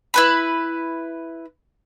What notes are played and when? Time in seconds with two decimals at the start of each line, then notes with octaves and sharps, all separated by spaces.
0.14 E4 B4 B5